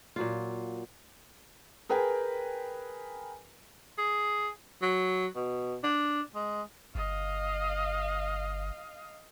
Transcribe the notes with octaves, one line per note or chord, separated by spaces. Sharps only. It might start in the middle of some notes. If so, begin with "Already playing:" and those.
A#2 F#3 F4
G#4 A#4 B4 G5 G#5
G#4
F#3
B2
D4
G#3
G1 D#5 F5